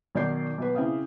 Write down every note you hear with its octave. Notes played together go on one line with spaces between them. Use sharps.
B1 D#3 D5 D6 G6 C7
B1 B4
C#3 C4 E4 F5 D#6